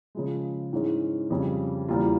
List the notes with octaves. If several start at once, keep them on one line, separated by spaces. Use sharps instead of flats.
C#3 F3 G#3
G#2 E3 G#3 C#4
F2 C#3 G3
E2 C#3 G3 A#3 F4